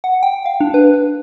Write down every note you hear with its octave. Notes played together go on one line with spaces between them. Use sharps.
F#5
G5
F5
D4
B4